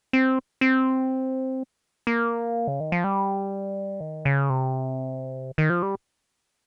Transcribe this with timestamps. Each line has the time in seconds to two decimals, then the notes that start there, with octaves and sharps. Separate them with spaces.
0.13 C4
0.61 C4
2.07 A#3
2.67 C#3
2.80 D#3
2.92 F3
3.04 G3
4.00 D#3
4.25 C#3
4.50 C3
5.58 D#3
5.70 F3
5.83 G3